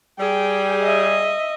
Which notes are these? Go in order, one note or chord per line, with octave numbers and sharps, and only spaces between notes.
G3 G#4 G5
D#5 E5